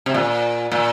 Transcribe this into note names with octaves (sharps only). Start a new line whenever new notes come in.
C3
A#2
A#2